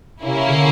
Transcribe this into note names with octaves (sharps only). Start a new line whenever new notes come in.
C3 A#3 C#4 E4
C#3
D3